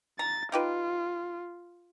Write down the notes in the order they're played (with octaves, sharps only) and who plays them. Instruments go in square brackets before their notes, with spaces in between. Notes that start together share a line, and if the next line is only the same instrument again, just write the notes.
[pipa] A#5 [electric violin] A6
[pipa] D#4 G4 B4 [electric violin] F4